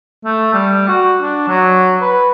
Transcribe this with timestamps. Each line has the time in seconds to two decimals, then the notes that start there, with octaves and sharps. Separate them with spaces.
0.25 A3
0.54 G3
0.88 F#4
1.22 D4
1.48 F#3
2.02 B4